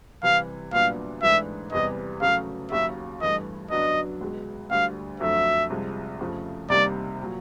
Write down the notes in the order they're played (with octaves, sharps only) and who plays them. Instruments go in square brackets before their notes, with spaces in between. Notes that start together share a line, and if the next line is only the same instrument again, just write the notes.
[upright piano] C3 E3 G3 [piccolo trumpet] F5
[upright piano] C2 A#2 F#3 B3 D4 [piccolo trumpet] F5
[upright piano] G#2 E3 A3 D4 [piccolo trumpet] E5
[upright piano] E2 C3 E3 G3 [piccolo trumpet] D#5
[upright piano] C#3 F#3 A3 [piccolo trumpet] F5
[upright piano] D#2 C#3 F#3 [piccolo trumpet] E5
[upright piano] G2 E3 A3 [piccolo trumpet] D#5
[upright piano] F#2 D3 F#3 B3 D4 [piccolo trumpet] D#5
[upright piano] C#2 B2 G#3
[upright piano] D2 D3 G3 [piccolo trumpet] F5
[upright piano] F2 D3 F#3 A3 [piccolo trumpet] E5
[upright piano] C2 C3 F3 G#3
F2 C#3 F3 A3
[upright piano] C2 C3 D#3 G3 A#3 [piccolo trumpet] D5
[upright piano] A#2 F#3